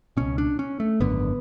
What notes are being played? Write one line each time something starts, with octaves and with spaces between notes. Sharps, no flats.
C#2 B2 C#4
D4
C#4
A3
G#1 F#2 D3 B3